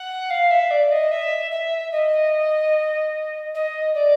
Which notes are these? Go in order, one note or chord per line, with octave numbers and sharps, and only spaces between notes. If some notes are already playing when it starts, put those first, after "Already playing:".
Already playing: F#5
F5
E5
D5
D#5
E5
E5
D#5
D#5
D5